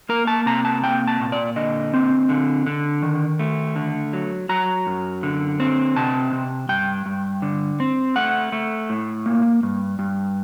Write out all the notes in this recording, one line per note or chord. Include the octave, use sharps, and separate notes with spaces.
A#3 A#4
A5
C3 A#5
A5
A#3 G5
A5
A#2
D5
D3 D#5
C4
D3
D3
D#3
A3
D3
F#3
F#3 A#5
F#2
D3
C4
C3 A5
C3
G2 G5
G2
D3
C4
A3 F#5
A3
A2
A#3
G2
G2